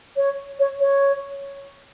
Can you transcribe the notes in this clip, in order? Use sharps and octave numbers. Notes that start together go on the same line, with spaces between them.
C#5
C#5
C#5